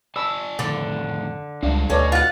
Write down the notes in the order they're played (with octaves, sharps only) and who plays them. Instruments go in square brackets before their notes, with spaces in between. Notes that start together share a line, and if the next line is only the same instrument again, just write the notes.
[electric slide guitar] D5 G#5 A5 [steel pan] B5 E6
[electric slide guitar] F2 A2 D#3 [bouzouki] D3
[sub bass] C#2 [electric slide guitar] F#3 G3 F5 [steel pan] D4
[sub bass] D2 [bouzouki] C#4 [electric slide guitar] F#4 D#5 [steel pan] A4 B4 D5
[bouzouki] F4 F#5